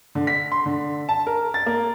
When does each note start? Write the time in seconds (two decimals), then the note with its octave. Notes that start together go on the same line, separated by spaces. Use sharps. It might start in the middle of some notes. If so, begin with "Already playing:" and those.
0.15 D3
0.27 B6
0.52 C6
0.66 D3
1.09 A5
1.27 A#4
1.54 A6
1.66 A#3